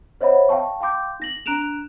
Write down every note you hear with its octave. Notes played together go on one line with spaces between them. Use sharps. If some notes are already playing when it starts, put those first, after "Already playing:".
C5 C#5 D#5 E5 F#5 B5
F5 G5 A5 C#6
F5 G5 C6 D6 G6
D#4 A#6 F#7
D4 A#5 F#6 D7 E7 F7